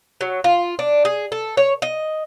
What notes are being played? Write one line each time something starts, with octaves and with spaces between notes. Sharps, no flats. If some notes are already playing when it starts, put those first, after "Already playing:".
F#3
F4
D4
G#4
A4
C#5
D#5